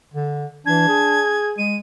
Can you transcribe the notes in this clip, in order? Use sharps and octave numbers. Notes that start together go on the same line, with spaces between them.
D3
E3 D4 G#6
G#4
G#3 D#7